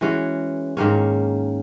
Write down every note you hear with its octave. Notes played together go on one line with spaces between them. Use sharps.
E3 G#3 C#4 F#4
G#2 D#3 A#3 C#4